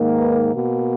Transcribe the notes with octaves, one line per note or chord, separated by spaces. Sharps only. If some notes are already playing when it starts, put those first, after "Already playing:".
Already playing: G#2 D#3 A#3
B4 D#5
B2 A#3